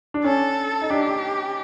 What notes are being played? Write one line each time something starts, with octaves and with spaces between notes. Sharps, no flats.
D4
C#4 A4
D#4
D4 G4